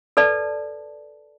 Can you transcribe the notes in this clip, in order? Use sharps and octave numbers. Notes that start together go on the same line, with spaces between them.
A4 B4 D5 A5